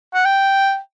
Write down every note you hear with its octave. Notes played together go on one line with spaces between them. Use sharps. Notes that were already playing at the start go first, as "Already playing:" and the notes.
F#5
G5